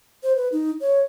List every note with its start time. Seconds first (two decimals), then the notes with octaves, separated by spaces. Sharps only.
0.23 C5
0.36 B4
0.52 D#4
0.81 C#5